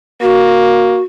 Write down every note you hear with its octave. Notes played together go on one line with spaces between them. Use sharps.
A#3 F#4